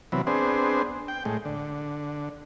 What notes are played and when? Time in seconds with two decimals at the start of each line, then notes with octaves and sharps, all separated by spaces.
0.12 C3 E3 F#3 B3
0.27 B3 C4 D4 G#4 C5
1.08 G5
1.25 A2 G#3
1.45 D3